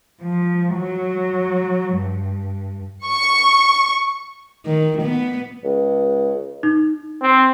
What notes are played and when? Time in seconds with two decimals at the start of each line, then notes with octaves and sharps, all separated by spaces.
0.22 F3
0.73 F#3
1.95 G2
3.07 C#6
4.66 D#3
5.01 B3
5.64 C#2
6.63 D#4
7.22 C4